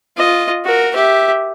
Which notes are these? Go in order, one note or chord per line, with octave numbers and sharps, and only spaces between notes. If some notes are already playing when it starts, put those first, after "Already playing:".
F4 D#5
F#4 A#4
G4 E5